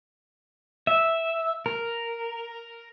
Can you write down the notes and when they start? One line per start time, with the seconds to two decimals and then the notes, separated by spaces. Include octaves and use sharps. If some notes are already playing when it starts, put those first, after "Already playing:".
0.87 E5
1.66 A#4